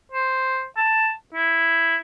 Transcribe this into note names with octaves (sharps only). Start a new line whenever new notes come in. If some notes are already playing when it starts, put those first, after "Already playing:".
C5
A5
E4